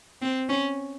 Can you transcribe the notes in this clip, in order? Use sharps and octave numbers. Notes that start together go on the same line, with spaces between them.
C4
C#4